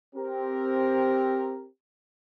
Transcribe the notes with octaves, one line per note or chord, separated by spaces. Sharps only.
C4 G4 A#4